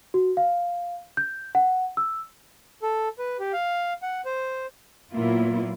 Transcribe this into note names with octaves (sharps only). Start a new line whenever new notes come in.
F#4
F5
G6
F#5
E6
A4
B4
G4
F5
F#5
C5
A#2 F#3 A#3 B3 E4 F4